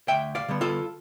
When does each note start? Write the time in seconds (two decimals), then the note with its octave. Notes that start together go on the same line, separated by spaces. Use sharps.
0.08 D2 E5 G5
0.35 D5 F5
0.48 D3 G3 B3
0.61 F4 A4